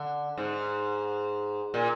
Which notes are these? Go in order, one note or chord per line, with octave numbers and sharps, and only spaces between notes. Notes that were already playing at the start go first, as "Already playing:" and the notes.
Already playing: D3
G#2
A#2